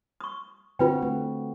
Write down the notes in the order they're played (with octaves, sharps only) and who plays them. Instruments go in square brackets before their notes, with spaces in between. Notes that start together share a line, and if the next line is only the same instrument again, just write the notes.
[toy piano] C#6 D#6
[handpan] D3 C4 F#4 [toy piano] F4 B4 G5
[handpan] A3